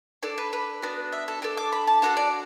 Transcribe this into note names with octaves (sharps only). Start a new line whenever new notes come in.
D4 A4 D5
B4
B4
B3 D4 F#4
E5
A4
D4 A4 D5
D6
B5
A5
D4 F#4 A4 F#5
D5